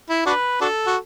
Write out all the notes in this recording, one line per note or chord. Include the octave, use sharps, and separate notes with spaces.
E4
D4 F#4 B4
D4 F#4 A4
F#4